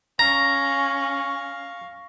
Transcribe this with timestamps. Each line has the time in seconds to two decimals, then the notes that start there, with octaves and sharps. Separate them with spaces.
0.19 C#4 F5 A#5 C#6 A#6